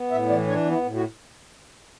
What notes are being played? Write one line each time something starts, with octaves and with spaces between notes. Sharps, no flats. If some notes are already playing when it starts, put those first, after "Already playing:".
Already playing: B3
A2 E5
E3 D5
D4 C#5
B3
E4
A2
F#4